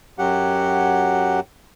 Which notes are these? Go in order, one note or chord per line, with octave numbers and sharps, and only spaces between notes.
F#2 F#3 G4 F#5